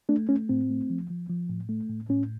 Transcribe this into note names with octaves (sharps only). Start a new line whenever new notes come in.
A3 D4
A3 C#4
A2 C4
A3
F3
F3
F3
A2
A3
A2
A2 C#4